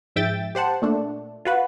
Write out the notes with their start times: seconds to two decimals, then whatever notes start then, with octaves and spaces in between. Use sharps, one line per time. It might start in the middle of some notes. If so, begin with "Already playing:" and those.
0.16 F2 G#2 E5 G5 A6
0.55 G4 C5 F#5 A5
0.82 A#2 A3 D4
1.45 F4 F#4 B4